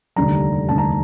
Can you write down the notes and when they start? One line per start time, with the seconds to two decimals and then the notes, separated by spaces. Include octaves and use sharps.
0.16 F1 D#2 D3 G3 A#5
0.68 F1 D#2 D3 G3 A5
0.78 A#5